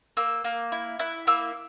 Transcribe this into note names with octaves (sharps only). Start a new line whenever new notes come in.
A#3 E6
A#3
E4
E4 F#6
A#3 E6